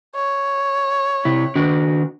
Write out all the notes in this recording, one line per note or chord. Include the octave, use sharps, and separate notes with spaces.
C#5
C3 E4
D#3 D4 F#4